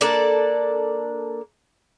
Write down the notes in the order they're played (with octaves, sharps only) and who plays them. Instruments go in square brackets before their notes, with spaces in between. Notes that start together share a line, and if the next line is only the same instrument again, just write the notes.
[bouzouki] A#3 D4 A4 D5